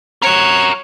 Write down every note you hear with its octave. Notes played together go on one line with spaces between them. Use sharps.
F#4 A#4 C#5